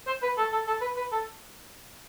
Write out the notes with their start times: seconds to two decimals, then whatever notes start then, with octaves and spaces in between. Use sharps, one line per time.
0.07 C5
0.22 B4
0.38 A4
0.52 A4
0.67 A4
0.81 B4
0.96 B4
1.12 A4